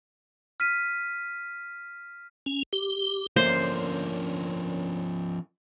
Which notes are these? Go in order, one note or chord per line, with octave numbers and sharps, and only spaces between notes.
F6 B6 D#7
C#4
G4
F#2 D3 F3 A#3 C#4 C5